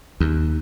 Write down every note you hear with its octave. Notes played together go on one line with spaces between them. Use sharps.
D#2